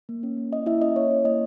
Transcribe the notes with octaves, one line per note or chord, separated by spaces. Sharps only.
A#3
C#4
A#3
E4 D#5
A#3 E4 E5
C#4 D#5
A#3 C#5
E4
A#3 D#5